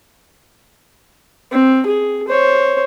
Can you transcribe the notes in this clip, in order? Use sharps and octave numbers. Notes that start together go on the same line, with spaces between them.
C4
G#4
C5 C#5